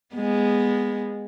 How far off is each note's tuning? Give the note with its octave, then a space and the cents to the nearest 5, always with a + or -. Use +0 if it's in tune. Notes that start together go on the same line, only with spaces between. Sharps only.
G#3 -10 B3 +0